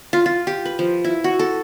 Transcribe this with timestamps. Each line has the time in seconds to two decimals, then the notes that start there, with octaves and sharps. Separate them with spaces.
0.13 F4
0.26 F4
0.47 G4
0.65 B4
0.79 F3
1.04 E4
1.24 F#4
1.39 A4